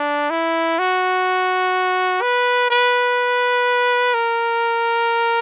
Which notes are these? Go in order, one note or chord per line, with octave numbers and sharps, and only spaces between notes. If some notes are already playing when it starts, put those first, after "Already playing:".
Already playing: D4
E4
F#4
B4
B4
A#4